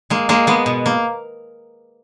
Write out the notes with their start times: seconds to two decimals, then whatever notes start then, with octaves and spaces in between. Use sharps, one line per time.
0.10 G#3 A#3
0.29 G#3 A#3
0.47 G#3 B3
0.66 B2
0.86 A#3